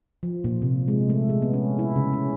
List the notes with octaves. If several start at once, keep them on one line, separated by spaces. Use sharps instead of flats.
F3
A#2
C3
G#3
A3
G#3
B3
C#4
E4
C#3
C#4